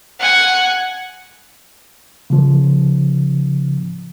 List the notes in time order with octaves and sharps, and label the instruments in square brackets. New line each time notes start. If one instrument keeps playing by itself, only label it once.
[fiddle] F#5 G#5
[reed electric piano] C#3 F3